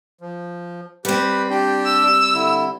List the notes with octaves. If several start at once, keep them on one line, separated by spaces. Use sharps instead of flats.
F3
G3 C4 G4 B4
D4 G4 G5
E6
D3 E4